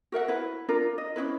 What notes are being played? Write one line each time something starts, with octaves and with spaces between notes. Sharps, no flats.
F#4 A#4 E5 F#5
E4 B4
D4 F4 A#4
D#5
C#4 D4 E4 B4